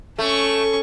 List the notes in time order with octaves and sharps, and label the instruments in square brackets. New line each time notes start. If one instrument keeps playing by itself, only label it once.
[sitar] A3 [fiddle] C#4 C#6